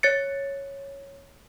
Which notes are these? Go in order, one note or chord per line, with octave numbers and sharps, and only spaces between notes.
C#5 A6 C#7